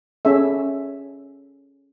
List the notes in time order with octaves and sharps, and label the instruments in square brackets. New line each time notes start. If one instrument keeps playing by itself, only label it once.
[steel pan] C#4 G#4 A4 E5